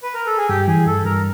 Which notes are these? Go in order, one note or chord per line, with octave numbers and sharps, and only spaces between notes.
B4
A#4
A4
G#4
G2 G4
E3 G#4
G2 A4
G2 A#4